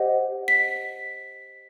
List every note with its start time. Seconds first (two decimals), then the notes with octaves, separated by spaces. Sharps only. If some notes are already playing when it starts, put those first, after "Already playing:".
Already playing: G4 C5 D#5 F#5
0.48 B6